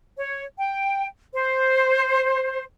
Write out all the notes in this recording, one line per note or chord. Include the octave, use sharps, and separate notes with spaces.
C#5
G5
C5